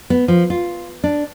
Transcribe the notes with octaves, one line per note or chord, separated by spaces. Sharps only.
B3
F3
F4
D4